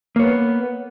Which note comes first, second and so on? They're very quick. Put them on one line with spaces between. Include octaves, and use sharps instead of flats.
A#3 C#5 B3